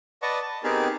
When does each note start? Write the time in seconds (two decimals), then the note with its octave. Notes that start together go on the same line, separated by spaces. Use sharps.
0.22 B4 D5 D#5 F#5 A5 C#6
0.42 A5
0.64 B3 C4 D#4 G4 G#4 A#4